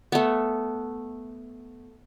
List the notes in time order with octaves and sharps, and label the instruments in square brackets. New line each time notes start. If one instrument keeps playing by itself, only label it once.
[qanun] A3 B3